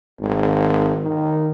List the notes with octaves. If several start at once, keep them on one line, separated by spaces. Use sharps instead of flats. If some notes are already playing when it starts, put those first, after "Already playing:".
G#1
D#3